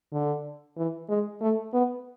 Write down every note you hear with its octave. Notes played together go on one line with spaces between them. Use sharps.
D3
E3
G#3
A3
B3